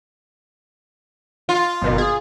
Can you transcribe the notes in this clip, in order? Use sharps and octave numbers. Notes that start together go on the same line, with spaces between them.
F4
G1 B2 D#3
G#4